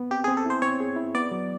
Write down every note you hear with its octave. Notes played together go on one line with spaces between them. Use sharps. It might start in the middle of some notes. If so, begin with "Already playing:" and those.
Already playing: B3
C4 G4
C4 G#4
A4
E4 C5
C4 C#5
G#4
E4
B3 D5
F#3